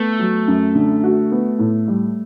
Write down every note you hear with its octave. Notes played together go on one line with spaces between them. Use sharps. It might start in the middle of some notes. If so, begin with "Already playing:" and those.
Already playing: A3 B3
F#3
F#2
D3
F#4
B3
A2
G3